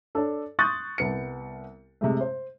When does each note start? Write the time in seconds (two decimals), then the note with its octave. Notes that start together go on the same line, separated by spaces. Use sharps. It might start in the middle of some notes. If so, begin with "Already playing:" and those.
0.15 D4 A4 C#5
0.59 C6 C#6 D#6 F#6 G6 A6
0.98 C2 B3 C#7
2.01 C3 G#3 A3
2.21 C5